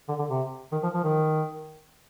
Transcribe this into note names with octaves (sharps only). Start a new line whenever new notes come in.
D3
D3
C3
D#3
F3
F3
D#3